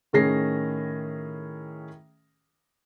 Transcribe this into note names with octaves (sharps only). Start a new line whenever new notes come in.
A2 D#3 C#4 G#4 A#6 C7